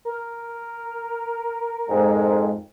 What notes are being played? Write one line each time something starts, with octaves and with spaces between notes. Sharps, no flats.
A#4
F2 G#2 G#3